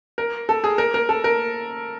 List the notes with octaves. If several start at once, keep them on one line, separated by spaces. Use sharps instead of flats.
A#4
A4
G#4
A#4
A#4
A4
A#4